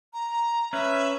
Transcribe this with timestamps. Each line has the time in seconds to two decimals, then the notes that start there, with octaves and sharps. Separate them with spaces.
0.14 A#5
0.73 C#4 B4 E5